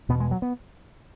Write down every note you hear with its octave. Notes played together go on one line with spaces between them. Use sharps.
E2 B2 B3
G#3
F#3
B3